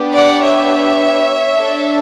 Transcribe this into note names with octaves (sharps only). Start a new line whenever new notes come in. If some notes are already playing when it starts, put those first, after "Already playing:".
Already playing: B3 D4 G4
D5 F#5
C#5 E5
D4 A4